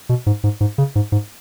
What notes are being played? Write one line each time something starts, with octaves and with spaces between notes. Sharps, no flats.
B2
G#2
G#2
G#2
C#3
G#2
G#2